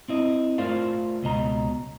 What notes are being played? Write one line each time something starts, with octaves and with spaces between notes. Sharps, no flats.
C4 E4 D#5
A3 F4 A#4 C5 D5 F5
C#2 B2 D#5 A#5